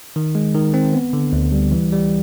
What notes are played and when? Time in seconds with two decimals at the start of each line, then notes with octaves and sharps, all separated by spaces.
0.16 D#3
0.35 G#3
0.55 D#3
0.74 C4
0.93 B3
1.13 D3
1.33 D2
1.53 G3
1.72 E3
1.92 G3